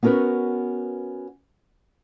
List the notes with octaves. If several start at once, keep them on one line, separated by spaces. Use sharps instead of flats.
B3 C#4 F#4 A#4 B4